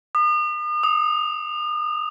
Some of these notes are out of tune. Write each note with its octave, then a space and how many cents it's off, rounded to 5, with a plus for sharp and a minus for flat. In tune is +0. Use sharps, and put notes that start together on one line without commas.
D#6 -40
D#6 +25